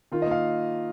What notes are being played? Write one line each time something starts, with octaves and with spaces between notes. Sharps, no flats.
D#3 F4
A#3 D#5
F5